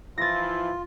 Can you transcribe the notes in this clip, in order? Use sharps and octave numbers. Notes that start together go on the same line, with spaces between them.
E3 F3 E4 F4 A6 A#6